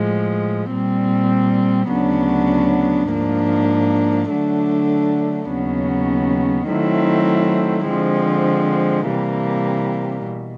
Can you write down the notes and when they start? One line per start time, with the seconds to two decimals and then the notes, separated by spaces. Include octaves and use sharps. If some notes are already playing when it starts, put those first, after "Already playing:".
Already playing: A2 F3 G#3
0.72 A#2 G3 C4
1.91 D2 C#3 F#3 B3 D4
3.11 G#2 F3 A#3 D4
4.30 D3 F#3 A3 D4
5.50 D#2 C#3 F#3 B3
6.68 D#3 F#3 A3 C4 E4
7.88 D3 F3 G#3 C4
9.07 C3 E3 G3 A#3
10.27 B2